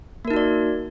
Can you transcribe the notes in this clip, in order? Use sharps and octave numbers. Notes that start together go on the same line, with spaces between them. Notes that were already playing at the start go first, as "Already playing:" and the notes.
A#3 D#4 F#4 A#4 D5